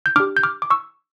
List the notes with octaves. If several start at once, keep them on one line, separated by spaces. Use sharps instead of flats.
G6
D4 G4 D6 F6
G6
D6 F6
D6
C#6 E6